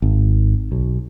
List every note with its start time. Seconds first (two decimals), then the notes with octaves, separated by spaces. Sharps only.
0.02 G#1
0.72 B1